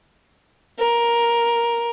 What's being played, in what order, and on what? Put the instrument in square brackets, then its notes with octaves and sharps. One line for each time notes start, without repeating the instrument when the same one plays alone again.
[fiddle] A#4